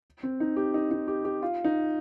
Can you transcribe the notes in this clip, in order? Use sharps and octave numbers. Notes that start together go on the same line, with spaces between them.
C4
D#4
G4
D#4
D#4
G4
G4
F4
D#4